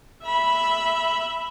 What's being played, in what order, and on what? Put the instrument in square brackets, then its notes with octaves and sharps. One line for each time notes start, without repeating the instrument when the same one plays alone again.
[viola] E5 B5